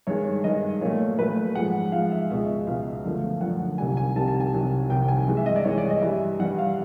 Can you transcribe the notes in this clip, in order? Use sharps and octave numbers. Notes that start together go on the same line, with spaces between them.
G2 D#3 G#3 C#5
G2 D#3 G#3 D#5
A#2 F#3 A3 C#5
A#2 F#3 A3 B4
G#2 F3 G#3 F#5
G#2 F3 G#3 F5
E5
C#2 B2 G#3 E5
C#2 B2 G#3 F5
F#2 D3 F3 A3
F#2 D3 F3 A3 F#5
C2 C3 D#3 G3 G#5
G#5
C2 C3 D#3 G3 A5
A5
G#5
C2 C3 D#3 F#3
C2 C3 D#3 F#3 G5
G#5
G2 E3 G#3
E5
D#5
D5
G2 E3 G#3 C#5
D5
D#5
G2 E3 G3 E5
G2 E3 G3 F#5
F5